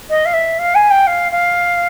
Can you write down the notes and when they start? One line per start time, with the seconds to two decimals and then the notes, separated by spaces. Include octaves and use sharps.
0.10 D#5
0.26 F5
0.33 E5
0.59 F5
0.75 G#5
0.91 G5
1.07 F5
1.32 F5